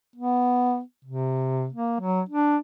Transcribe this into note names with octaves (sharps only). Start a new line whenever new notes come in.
B3
C3
A#3
F#3
D4